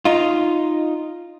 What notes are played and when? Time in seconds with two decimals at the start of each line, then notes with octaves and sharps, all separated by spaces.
0.05 D#4 F4